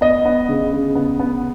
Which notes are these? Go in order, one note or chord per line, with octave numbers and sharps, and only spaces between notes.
B3 D#5
B3
C#3
C#3
B3
B3